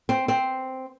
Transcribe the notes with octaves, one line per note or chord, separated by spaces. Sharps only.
C4
C4